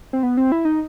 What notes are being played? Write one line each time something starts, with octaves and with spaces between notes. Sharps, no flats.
C4
B3
C4
E4
D#4